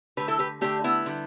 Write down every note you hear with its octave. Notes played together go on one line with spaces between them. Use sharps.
D3 A3 G4 B4
E4 A4
G4 B4
D3 A3 D4 G4
B3 E4
D3 G3